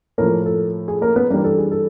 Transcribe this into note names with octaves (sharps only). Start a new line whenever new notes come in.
A2 F3 A#3 A#4
A4
G#4
A#3 A#4
B3 B4
G2 E3 G3 A#3 A#4
A4
G#4
A4